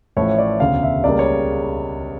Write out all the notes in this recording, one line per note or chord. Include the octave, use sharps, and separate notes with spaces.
A1 A2 F3 A3 C#5
D5
E1 D2 C#3 F5
E5
C#2 C#3 G3 A#3 D5
C#5